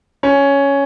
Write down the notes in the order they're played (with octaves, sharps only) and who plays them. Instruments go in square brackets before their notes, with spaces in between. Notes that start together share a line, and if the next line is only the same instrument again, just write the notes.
[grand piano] C#4